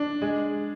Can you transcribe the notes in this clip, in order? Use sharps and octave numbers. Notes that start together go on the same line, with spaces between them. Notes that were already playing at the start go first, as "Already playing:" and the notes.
Already playing: D4
G#3